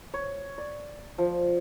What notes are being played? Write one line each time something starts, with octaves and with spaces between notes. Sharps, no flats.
C#5
D5
F3